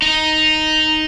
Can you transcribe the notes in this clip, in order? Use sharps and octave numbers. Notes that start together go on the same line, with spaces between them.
D#4